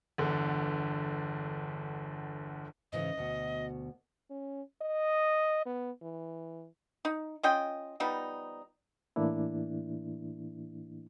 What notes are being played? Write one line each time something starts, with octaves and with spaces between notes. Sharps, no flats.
G1 E2 D3
G#2 C#3 E3 D#5
D2 B2
C#4
D#5
B3
E3
D#4
C#4 F4 D#5 G5
F3 G3 B3 D#4
A2 E3 A#3 D4 E4